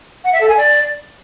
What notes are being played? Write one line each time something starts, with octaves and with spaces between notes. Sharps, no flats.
F#5
E5
A4
G#5
D5